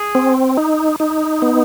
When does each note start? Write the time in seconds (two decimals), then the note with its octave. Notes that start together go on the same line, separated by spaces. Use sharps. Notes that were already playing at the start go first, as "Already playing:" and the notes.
Already playing: G#4
0.15 C4
0.57 D#4
1.00 D#4
1.42 B3